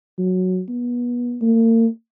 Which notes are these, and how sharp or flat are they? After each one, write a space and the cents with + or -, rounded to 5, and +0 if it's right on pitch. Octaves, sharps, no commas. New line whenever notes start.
F#3 -5
B3 -25
A#3 -40